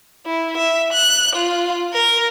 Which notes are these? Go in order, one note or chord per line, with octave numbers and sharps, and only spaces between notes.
E4
E5
F#6
F4
A#4